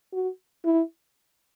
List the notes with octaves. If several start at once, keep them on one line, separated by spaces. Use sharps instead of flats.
F#4
E4